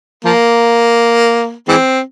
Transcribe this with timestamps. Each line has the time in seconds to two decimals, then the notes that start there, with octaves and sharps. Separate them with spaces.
0.25 F3 A#3
1.68 E3 G#3 C4